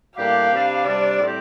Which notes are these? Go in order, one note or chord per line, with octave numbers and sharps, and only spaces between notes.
A2 G3 A#3 D4 G4 F5
C3 G3 D4
C3 G3 D4 D5
A2 G3 C4 G4